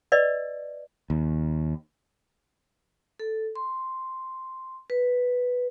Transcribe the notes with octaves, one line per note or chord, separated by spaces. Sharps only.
B4 D5 D#5
D#2
A4
C6
B4